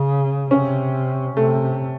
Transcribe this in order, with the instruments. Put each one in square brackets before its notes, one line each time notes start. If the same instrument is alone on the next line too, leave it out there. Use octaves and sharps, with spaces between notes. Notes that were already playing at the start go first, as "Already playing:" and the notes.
Already playing: [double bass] C#3
[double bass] C3 [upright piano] C#4
[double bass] C3 [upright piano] A3